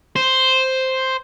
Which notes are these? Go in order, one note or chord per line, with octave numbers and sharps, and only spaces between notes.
C5